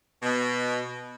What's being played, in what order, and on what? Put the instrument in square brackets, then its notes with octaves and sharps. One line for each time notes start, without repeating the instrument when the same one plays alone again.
[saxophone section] B2